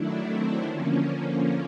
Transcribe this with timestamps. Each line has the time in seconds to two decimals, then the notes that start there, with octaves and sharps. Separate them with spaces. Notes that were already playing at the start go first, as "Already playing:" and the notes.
Already playing: D#3 F#3 A3 D4 E4
0.27 C4 D4
0.65 D3 F3 A#3 C#4
1.03 C#4